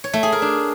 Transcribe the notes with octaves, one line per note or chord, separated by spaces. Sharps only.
C#5
A3
G#4
A#4
D4